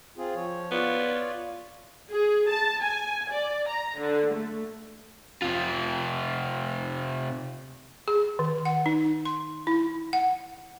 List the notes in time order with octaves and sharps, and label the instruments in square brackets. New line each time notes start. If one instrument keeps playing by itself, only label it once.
[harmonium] C4 F4 G#4
F3 C#5
[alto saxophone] B3 [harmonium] F4 C#5 D5
[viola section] G#4
A5
G#5
D5
A#5
D3
A3
[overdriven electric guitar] C3 F4
[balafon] G#4
D#3
F#5
D#4
C6
E4
F#5